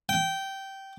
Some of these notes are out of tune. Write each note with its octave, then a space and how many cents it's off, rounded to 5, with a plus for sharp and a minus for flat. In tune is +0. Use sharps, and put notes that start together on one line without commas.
G5 -15